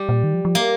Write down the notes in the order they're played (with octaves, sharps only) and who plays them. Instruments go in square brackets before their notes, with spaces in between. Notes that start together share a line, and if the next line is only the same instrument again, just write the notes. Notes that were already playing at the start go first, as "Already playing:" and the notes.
Already playing: [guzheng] G3
[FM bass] A#2
D#3
F3
F3
[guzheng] A#3